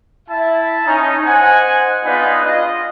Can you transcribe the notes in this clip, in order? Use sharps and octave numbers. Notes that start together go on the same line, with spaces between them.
E4 E5 A5
C#4 D#4
C5 D#5 F#5 G#5
B3 D4 D#4 F4 G#4 B4
F4 D#5